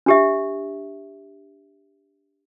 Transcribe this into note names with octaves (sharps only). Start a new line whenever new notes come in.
D4 G4 E5